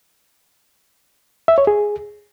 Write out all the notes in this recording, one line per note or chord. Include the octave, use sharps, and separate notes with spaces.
E5
C#5
G#4